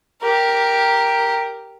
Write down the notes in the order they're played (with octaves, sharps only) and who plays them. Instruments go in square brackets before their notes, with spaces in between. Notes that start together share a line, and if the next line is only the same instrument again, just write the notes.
[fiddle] G4 A#4